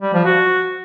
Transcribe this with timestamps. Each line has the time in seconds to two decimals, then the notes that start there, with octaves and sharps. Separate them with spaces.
0.02 G3
0.14 F3
0.25 F#4